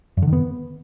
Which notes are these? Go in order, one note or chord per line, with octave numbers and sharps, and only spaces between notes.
F#2
D3
D#3
B3